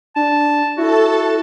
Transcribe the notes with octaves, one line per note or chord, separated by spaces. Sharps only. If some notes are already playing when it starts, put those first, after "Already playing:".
D4 A5
E4 F#4 A4 A5